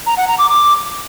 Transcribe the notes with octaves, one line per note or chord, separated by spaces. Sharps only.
A#5
F#5
A#5
D6
D6